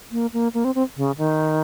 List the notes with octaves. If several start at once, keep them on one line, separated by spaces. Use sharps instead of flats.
A#3
A#3
A#3
C4
C4
C#3
D#3